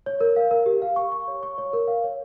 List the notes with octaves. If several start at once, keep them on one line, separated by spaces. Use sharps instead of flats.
C#5
A#4
F5
A#4
G4
F5
C#6
C#6
C#5
C#6
C#5
A#4
F5
C#5